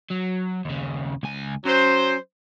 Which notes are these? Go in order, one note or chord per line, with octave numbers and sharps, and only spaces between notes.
F#3
D#2 C#3
C#2 G#5
F#3 C#4 C5